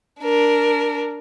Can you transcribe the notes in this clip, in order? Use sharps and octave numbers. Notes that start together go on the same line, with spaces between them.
D4 A#4